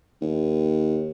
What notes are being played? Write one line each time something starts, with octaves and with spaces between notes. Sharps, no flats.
D#2